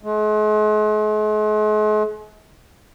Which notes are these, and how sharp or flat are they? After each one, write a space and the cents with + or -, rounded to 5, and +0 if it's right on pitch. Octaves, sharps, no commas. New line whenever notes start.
G#3 +40